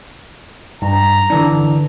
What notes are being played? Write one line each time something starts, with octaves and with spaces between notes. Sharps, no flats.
G2 A#5
D3 E3 D4